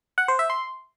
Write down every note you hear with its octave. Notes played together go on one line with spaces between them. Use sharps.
F#5
C5
E5
C6